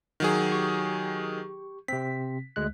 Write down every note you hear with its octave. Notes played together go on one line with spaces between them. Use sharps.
D#3 F#3 G#4
G4 C#6
C3 C4 B6
D2 G#3 F#6